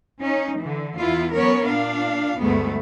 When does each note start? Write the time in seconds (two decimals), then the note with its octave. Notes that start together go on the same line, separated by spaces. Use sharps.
0.20 C#4 D#4
0.59 D3 E3
0.97 E2 B3 E4 F4
1.34 F#3 B3 C#4 A#4 C#5
1.66 A#2 D4 F5
2.40 D2 G2 G#3 A3 B3